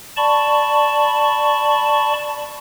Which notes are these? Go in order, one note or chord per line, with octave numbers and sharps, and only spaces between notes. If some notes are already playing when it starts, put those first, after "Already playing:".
D5 A5 B5 C#6